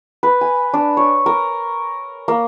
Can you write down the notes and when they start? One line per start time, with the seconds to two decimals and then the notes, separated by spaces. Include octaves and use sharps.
0.23 B4
0.41 G#5
0.74 D4
0.97 C#5
1.26 A#4
2.28 A#3